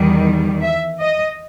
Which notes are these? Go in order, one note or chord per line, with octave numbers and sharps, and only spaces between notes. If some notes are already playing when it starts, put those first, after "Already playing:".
Already playing: E2 D#3 G3
E5
D#5